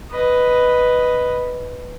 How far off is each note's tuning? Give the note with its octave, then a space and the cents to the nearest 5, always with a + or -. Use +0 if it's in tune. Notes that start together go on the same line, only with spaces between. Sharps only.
B4 +0 D#5 +0